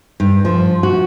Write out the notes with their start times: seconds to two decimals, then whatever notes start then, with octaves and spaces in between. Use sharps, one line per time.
0.20 G2
0.45 F3
0.83 F#4